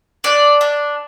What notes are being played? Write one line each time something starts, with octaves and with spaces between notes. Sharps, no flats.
D4 D5
D4